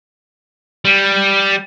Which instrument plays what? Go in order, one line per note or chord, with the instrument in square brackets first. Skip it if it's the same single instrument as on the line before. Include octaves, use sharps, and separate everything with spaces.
[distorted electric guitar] G3